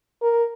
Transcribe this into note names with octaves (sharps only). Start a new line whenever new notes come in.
A#4